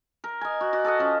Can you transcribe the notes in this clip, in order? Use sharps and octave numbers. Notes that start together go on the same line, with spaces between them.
A#4
D#5 G#5
F#4
F#4 D5
A4 D5 D#5 F#5
F3 C#4